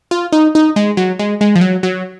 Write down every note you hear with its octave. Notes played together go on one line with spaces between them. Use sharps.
F4
D#4
D#4
G#3
F#3
G#3
G#3
F3
F#3
F#3